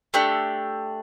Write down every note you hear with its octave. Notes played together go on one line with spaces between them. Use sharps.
A3 D4 G4